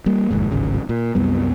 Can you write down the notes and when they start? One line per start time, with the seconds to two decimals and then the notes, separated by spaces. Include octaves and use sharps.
0.06 G3 A#3
0.31 F1 D#2 G#2
0.51 D1 G#1 C#3
0.89 A#2
1.15 C2 F#2 G3 B3